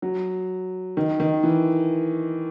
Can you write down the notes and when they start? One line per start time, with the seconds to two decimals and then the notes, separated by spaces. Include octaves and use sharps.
0.02 F#3
0.97 D#3
1.20 D#3
1.43 E3